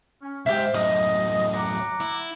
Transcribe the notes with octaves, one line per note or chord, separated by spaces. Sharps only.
C#4
C2 G#2 G4 C5 E5 F5
F#2 A2 D#5 D#6
F#5 A#5 D6
E4